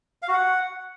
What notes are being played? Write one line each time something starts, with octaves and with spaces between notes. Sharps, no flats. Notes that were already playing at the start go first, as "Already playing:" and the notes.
F5
F#4
F#5